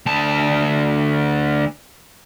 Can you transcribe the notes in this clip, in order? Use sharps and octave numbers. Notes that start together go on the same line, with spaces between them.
D2 A5